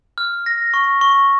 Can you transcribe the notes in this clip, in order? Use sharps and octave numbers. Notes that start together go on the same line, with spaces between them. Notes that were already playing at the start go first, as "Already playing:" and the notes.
F6
A#6
C#6
C#6